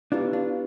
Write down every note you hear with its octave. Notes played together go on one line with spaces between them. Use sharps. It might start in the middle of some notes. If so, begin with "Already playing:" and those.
B3 D4 E4 F4 G4 B4
D4 F4